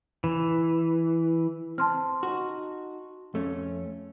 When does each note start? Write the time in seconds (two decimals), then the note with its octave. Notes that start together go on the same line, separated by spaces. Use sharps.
0.24 E3
1.78 C4 A5 C6 F6
2.23 D#4 F#4
3.34 F2 A3 C#4